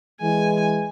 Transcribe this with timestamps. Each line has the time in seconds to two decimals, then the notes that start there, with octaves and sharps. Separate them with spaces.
0.21 E3 G#3 G#5